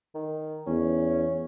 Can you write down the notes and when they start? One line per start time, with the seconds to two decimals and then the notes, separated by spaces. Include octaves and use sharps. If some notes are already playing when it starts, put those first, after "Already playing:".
0.15 D#3
0.67 E2 C#4